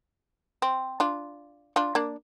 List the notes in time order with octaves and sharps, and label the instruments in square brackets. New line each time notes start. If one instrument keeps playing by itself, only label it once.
[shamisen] C4
D4 F4
D4 F4
A#3 D4